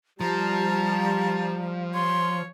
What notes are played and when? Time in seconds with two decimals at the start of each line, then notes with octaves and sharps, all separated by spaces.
0.21 F3 G3 A5 A#5
1.94 C#5 C6